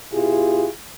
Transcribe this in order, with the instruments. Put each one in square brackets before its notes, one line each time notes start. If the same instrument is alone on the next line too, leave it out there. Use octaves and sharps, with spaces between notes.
[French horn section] B2 E4 F4 G4 G#4